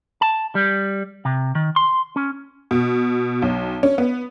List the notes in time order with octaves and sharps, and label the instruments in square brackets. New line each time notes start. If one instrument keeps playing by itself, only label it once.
[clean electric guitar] A5
G3
C3
D#3
C6
C#4
[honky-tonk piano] B2
B1
C#4
B3